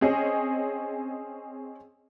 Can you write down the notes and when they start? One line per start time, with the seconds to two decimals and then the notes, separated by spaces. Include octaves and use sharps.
0.01 C4 C#4 G#4 C#5 D#5